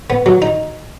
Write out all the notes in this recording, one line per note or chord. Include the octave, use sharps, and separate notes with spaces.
B3
F#3
D#4